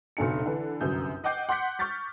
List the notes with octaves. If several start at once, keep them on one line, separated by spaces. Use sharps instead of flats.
F1 A#1 B2 D3 G#5 C#7
D3 E3 B4
G1 C2 F#2 D#6 G6
D#5 F#5 G5 D6 G6 C7
F#5 C6 F#6 G6 B6 C#7
C#6 F6 G6 A6 B6